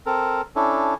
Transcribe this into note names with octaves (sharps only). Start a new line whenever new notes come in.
C4 A4 A#4
C#4 D4 E4 A4